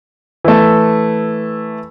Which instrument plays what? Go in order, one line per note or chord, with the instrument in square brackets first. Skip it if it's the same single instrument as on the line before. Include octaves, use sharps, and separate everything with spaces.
[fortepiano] E3 A3